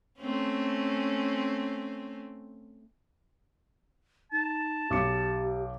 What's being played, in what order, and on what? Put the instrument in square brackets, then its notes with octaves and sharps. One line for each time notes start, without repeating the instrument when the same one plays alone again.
[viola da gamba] A3 C4 C#4
[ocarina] D#4 [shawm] A5
[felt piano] B1 D6 C#7 [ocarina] G4